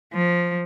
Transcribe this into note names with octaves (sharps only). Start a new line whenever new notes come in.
F3